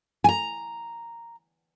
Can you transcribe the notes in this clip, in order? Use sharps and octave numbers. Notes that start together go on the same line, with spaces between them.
G#5 A#5